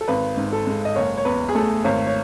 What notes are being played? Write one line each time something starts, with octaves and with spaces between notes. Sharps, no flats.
A4
G#1 B4
G#2
A4
G#3
D#5
F#1 C#5
C#5
E2 B4
G#4
A3 A4
G#1 C#5
C#5